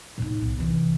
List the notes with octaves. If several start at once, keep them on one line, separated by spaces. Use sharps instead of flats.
A2 D#4
B1
C3 E3